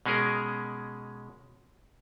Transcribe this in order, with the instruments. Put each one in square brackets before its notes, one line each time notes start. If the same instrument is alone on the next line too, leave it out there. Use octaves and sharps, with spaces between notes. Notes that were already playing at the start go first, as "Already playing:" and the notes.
[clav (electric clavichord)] B2 G#3 C#4 G#4 A#4